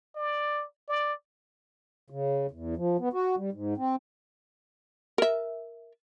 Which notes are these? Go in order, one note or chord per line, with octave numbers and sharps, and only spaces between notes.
D5
D5
C#3
E2
F3
B3
F#4
G3
G#2
C4
A#4 E5